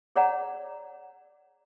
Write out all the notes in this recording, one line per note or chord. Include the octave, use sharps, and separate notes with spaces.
G#4 C#5 D5 F#5 A#5